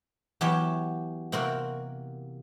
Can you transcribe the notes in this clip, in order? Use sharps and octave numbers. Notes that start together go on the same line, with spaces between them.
E2 F#3 G4 C#5 E5 G5
C3 A#3 C4 F#4 A#4